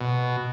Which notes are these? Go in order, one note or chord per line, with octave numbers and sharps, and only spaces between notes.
B2